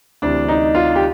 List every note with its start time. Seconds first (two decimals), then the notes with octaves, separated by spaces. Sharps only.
0.22 D2 C3 E3 D4
0.48 D#4
0.75 F4
0.96 G4